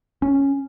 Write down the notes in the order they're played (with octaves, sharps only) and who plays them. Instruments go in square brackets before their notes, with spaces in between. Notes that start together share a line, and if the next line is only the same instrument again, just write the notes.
[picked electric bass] C#4